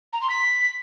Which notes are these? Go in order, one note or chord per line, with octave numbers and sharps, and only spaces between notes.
A#5
C6
B6